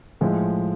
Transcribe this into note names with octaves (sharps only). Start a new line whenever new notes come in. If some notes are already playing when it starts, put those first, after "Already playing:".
A2 F3 G#3